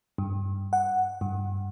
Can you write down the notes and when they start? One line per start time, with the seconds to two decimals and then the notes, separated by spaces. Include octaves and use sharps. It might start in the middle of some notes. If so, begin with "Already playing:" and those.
0.18 G2
0.73 F#5
1.21 G2